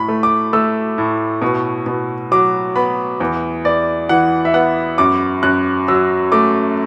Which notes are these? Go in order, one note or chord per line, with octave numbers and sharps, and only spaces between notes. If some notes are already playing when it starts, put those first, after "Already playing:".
Already playing: A2 B5
A3
D6
A3 E6
A2
B2
B2
F#3 D6
B3 B5
E2
E2 D5
E3 F#5
E5
B3 F#5
F#2 D6
F#2 F#6
F#3 E6
A3 D6